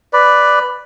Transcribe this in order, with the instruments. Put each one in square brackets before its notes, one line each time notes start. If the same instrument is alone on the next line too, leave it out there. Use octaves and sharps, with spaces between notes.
[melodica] B4 D5